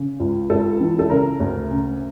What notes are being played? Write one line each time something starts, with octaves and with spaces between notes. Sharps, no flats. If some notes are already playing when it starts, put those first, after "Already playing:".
Already playing: C#3
C#2
C#2 A4
E3
A4
C#3 A#4
D2
C#3